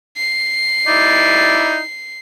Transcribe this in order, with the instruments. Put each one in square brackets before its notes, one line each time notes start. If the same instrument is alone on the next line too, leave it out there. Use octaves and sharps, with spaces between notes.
[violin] C7
[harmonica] D#4 E4 D5